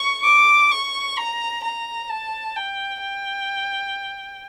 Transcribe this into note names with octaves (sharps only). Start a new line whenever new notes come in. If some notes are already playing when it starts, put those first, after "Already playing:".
Already playing: C#6
D6
C#6
A#5
A#5
A5
G5
G5